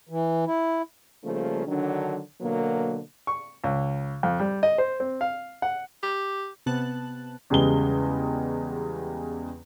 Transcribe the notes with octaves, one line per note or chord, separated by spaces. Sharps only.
E3
E4
C#3 F3 G3 A3 A#3
D3 D#3 F#3 D4
B2 D3 F#3 A#3
C#6
C#2
F2
G3
D#5
C5
C4
F5
F#5
G4
C3 B3 A5 F#6
E2 C#3 G3 G#3 G7